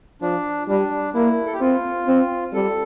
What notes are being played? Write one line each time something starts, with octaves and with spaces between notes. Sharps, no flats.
F3 D4
G3 D4
A#3 E4
A4
G4
C4 F4
C4
G3 A4